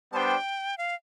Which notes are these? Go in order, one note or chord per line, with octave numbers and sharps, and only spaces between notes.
G3 B3 D4 G4 C5 G5 A5
F5